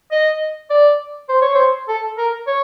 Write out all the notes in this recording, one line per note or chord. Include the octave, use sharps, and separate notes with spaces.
D#5
D5
C5
C#5
C5
A4
A#4
C#5